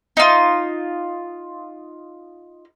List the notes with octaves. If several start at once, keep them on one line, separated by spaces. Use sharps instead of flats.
D#4 F4